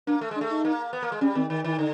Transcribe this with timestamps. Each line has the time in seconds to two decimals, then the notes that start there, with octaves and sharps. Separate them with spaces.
0.07 A#3 D4
0.21 A3
0.31 G#3
0.36 D4
0.41 A3
0.50 D#4
0.65 A#3
0.93 B3
1.02 A#3
1.12 G#3
1.21 G3 C#4
1.35 D#3 C4
1.50 D#3
1.64 D#3 E4
1.79 D3 D#4